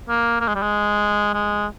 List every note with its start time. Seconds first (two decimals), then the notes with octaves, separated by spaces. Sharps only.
0.09 A#3
0.41 A#3
0.48 G#3
0.55 G3
0.62 G#3
1.34 G#3